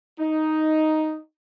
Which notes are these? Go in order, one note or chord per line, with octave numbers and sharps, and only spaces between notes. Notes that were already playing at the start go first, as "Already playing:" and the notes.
D#4